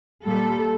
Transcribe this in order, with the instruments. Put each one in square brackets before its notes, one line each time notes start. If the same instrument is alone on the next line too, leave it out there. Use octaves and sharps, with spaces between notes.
[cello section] A#2 G3 A4